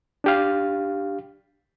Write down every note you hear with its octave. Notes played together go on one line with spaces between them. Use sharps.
D4 G4 F5